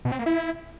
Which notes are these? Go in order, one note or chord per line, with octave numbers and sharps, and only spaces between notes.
B2
C4
A#3
E4